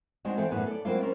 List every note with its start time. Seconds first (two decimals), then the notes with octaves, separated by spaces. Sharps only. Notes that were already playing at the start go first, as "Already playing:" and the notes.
0.25 G#3 B3 C4 D4 D#4 F#4
0.37 D3 E3 C4 A4 C5
0.51 F#2 A2 B3 A4 B4 G#5
0.66 A4 D5
0.85 F#3 G#3 A#3 C4 E4 F4
1.01 C4 C#4 A#4